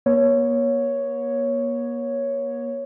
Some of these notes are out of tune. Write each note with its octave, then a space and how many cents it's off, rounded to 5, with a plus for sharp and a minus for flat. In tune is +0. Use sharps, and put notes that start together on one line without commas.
A#3 +45 C#5 +0